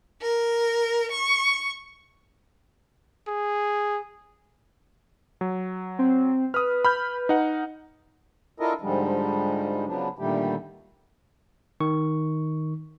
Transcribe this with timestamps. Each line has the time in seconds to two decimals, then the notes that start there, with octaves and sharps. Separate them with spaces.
0.21 A#4
1.10 C#6
3.28 G#4
5.41 F#3
5.99 C4
6.54 B4 D#6 F6
6.85 B5 F6 G6
7.29 D#4 F#5
8.60 D4 E4 F4 A4 A#4 D#5
8.81 G#2 D3 F3 G3 G#3
9.86 C#3 F3 F#3 B3 D4
10.19 A#2 D3 D#3 G3 A3 G4
11.80 D#3 C#6